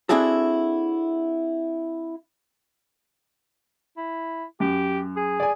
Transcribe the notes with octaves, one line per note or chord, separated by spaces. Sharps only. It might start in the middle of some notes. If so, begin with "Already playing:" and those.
C4 D4 E4 F#4 G#4 A4
E4
F#2 G4
G#4
D5 G#5